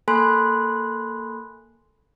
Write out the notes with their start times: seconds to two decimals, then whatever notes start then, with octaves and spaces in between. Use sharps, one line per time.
0.08 A#3 A4 G#5 B5 C6 F#6